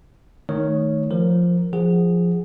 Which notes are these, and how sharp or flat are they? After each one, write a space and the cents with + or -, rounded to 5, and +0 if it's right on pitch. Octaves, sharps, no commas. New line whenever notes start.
D#3 +0 A3 +0 C#5 +0
F3 +5 A#4 +0
F3 +0 G#4 -10 F#5 +0